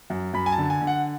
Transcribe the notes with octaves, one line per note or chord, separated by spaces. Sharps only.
F#2
F#2 B5
G#5
A5
D3
G#5
D3
F#5